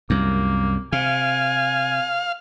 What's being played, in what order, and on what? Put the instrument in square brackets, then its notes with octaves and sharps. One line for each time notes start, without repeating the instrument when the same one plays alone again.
[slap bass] C2 F#2 [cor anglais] A#3
[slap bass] C3 [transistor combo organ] F5 [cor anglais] G#5